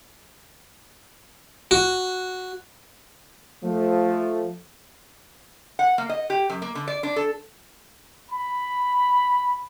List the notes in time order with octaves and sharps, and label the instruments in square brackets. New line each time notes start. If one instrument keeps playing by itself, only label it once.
[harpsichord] F#4
[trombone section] F3 A3
[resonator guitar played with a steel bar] F#5
A#3
D#5
G4
F#2
A#3
D3
D5
D4
A4
[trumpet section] B5